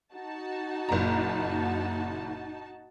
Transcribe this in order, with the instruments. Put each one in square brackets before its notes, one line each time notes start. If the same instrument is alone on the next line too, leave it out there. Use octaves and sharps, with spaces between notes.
[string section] D#4 F#4 A5
[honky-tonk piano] F#1 A#2 A#5